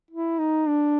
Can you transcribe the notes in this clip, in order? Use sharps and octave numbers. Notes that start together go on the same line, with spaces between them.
E4
D#4
D4